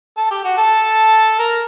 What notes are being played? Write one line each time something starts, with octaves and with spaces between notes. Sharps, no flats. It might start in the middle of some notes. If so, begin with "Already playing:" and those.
A4 A5
G4 G5
F#4 F#5
A4 A5
A#4 A#5